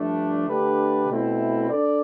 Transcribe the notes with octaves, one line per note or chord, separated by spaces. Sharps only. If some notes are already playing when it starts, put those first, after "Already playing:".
Already playing: G2 F3 A3 D4
D3 A3 D4 G4 B4
B2 A3 C4 E4
D4 A4 D5